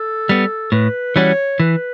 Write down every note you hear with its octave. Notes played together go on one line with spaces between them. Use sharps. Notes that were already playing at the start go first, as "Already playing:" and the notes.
Already playing: A4
G3 B3
A2 B4
E3 G3 C#4 F#4 C#5
E3 B4